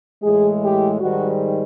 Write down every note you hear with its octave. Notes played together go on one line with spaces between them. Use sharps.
A2 E3 G#3 G#4
G4
G#2 D#3 G3 F#4